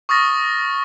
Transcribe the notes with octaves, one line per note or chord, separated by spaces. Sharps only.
C#6 D#6 F6 A6 A#6